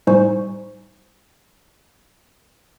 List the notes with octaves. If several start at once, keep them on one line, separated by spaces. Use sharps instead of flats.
A2 G3 D#4 C5 G#5 C#6